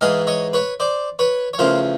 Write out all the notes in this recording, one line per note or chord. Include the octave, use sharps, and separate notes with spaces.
G#2 E3 G#3 D#5 F5
C#5 D#5
B4 C#5
C5 D5
B4 C#5
C#5
E2 C#3 F3 A3 A#4 C5